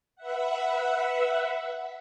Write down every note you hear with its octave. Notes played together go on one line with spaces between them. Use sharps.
B4 E5 F#5